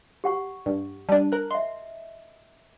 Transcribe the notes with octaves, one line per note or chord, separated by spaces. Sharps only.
G4 F#5 C#6
G2
G3 D4 A5
A#4 F#6
D#5 E5 C6